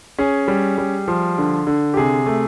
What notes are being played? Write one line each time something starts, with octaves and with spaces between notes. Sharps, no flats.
C#4 G#4
G3
G3
F3
D3
D3
G4
C3 G#4
A3